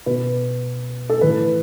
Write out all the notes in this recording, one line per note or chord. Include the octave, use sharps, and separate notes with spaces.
B2 B4
A4
A2 E3 B4